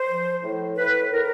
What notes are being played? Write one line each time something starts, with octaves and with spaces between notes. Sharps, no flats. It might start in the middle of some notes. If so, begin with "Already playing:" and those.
Already playing: C5
F3
A2
A2 B4
A2 A#4